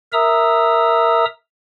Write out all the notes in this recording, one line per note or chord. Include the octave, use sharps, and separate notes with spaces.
A#4 E5 A#5 D#6 E6